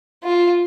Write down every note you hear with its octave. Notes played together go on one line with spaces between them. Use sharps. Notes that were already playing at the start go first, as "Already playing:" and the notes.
F4